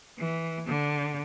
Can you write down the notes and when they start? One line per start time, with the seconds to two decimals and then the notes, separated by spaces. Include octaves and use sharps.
0.19 E3
0.66 D3